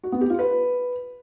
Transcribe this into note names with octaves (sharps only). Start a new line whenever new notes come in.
F#4
B3
G4
F4
B4